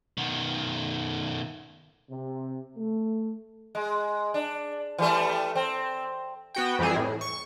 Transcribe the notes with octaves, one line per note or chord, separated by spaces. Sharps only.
B2 D#3
C3
A3
G#3
D4
E3 G3 A3
C4
B3 F#4 G5
F2 E3 G3 C4 G#4
A2
C#6